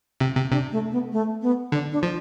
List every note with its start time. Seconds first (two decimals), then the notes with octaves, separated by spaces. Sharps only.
0.20 C3
0.36 C3
0.52 C3 D4
0.72 A3
0.92 B3
1.12 A3
1.42 B3
1.72 D3 D4
1.92 D4
2.03 F3